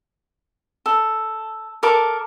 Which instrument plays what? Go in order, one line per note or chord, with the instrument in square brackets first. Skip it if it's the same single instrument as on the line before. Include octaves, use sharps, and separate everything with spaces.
[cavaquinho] A4
A4 A#4 D6